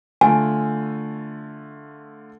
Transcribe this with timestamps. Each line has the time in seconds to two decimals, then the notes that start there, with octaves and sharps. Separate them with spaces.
0.21 D3 A3 F4 G#5